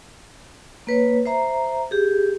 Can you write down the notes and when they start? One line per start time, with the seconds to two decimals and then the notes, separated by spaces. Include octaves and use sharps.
0.87 A#3 B4 C#5
1.26 C5 E5 A#5
1.91 G4 G#4